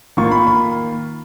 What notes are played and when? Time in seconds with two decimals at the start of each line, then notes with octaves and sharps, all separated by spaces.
0.17 D#3 A#3 F4 C#6
0.31 B5
0.47 B5